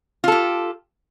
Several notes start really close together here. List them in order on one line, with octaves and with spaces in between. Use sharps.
F4 A4 G4